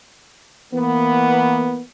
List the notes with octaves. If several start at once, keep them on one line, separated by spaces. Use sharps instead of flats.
E3 A#3 B3